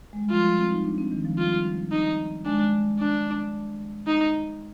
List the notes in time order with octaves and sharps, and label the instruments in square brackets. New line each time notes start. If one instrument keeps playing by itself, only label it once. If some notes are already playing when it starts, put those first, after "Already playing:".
[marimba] G#3
G3
[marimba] F3 [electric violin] F4
[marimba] F3
C4
D#4
D4
C4
D#3
F3
[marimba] G3 [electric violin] F4
[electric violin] D#4
[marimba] G#3 [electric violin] D4
[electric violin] D4
D#4